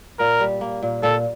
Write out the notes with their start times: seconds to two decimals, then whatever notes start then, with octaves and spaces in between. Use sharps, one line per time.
0.19 A#2 A#4
0.40 G3
0.61 A#3
0.82 A#2
1.03 A#2 A4